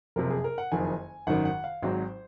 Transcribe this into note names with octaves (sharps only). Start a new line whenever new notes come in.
F#1 F2 C3 F3 A#4
G#4
A#4
F#5
F#1 F2 D#3 G#5
G#1 F#2 D#3 F#5
F#5
F5
G#1 G#2 F#3 C4 C5